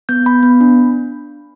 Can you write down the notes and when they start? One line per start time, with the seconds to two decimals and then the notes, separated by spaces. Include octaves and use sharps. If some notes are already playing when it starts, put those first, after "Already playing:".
0.09 B3 G6
0.26 B3 B5
0.43 B3
0.61 D4